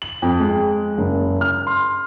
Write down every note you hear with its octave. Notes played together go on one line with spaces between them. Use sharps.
F#7
F2
G#3
F#1
F6
C6